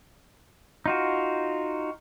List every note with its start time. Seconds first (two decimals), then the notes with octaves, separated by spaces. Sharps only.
0.86 D#4 F4 F#4